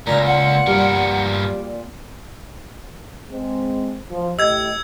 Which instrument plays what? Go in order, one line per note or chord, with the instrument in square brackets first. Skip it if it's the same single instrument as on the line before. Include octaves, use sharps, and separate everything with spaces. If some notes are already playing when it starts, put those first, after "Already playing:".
[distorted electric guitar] C#2 [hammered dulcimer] A#2 F5 [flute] A#5
[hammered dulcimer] F4 [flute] F#5
[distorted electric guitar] G2 A#4 [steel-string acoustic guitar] G3
[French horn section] G#3 C4
F3
[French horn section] A2 G4 D#5 [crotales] E6 G#6